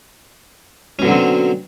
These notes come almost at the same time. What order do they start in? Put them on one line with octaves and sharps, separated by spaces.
C#4 B2 D3 F#3 C4